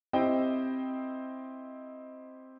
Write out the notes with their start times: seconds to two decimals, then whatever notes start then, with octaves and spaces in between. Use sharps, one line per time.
0.13 C4 E4 G4 C5 D#5 G5